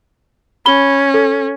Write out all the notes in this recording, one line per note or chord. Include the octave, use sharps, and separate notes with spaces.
C#4 B5 G7
A4